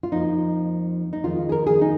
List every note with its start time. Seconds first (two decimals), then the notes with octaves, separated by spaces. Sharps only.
0.03 F4
0.12 F2 F3 A#3 D#4
1.13 D#4
1.24 F2 D#3 G#3 F4
1.49 G#4
1.52 A#4
1.67 G#4
1.81 D#4